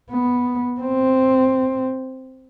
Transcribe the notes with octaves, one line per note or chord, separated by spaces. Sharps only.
B3
C4